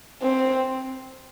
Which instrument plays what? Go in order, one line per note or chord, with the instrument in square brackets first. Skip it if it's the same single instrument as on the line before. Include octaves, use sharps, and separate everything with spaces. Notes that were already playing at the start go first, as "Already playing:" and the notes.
[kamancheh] C4